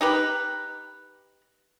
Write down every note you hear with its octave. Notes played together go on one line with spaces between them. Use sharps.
D#4 G4 B4